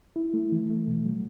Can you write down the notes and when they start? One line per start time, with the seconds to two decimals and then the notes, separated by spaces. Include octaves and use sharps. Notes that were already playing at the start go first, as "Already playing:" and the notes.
0.16 E4
0.34 A3
0.52 E3
0.70 A3
0.88 B2
1.05 F#3